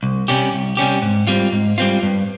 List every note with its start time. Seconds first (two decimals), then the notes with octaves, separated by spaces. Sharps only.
0.03 C2
0.28 C3 G3 C#4 G4
0.53 C2
0.77 C3 G3 C#4 G4
1.02 G#2
1.27 G3 C4 F4
1.52 G#2
1.78 G3 C4 F4
2.03 G2